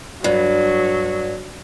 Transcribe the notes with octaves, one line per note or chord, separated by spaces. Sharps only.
G2 F#3